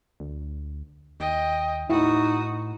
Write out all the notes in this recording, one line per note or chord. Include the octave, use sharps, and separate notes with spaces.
D2
D#2 D#5 G5
A2 D#4 E4 F#4 D#6